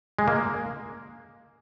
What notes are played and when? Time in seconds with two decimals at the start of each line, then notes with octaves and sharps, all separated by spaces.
0.19 G#3
0.28 A#3